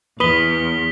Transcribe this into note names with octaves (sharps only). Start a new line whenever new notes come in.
E2 B4 D#6 B6 G7